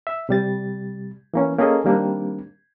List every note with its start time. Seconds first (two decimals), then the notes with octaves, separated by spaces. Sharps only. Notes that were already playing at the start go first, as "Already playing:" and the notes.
0.07 E5
0.29 C3 G3 A6
1.34 E3 A#3 C#4
1.58 A#3 C#4 G#4 A4 D#5
1.84 D#3 G3 A#3 C4 D4